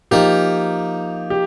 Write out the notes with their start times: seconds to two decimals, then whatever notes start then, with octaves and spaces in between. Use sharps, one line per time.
0.11 F3 A#3 D#4 G4
1.30 G4